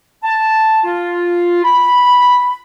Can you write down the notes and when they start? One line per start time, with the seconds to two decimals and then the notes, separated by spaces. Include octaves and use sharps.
0.24 A5
0.84 F4
1.64 B5